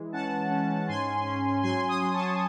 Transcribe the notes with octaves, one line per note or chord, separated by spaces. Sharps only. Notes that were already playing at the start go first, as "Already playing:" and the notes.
Already playing: E3 G#3
C#4 F#5 A5
C#4
G#2 G#5 C6
C#4
F#3 G#5 C6
C6 D#6
F#3
A5 C#6